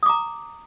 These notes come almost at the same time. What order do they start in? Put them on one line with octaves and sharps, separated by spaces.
D#6 D6 A#5